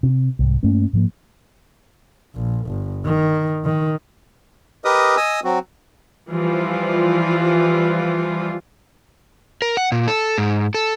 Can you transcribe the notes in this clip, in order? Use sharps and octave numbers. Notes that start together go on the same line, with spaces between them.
C3
C2 G#2
G2 A3 A#3 C#4
G#2 F3 A#3
A#1
G1
D#3
D#3
G4 A#4 B4 D#5 D#6
D#5 G#5 D#6 E6
F#3 C4 F#4
E3 F3 G3 F4
A#4
F#5
A#2
A4
G#2
A4